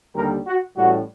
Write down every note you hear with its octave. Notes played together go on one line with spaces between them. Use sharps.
D#2 D3 G3 A#4
F#4
A1 A2 G3 F#4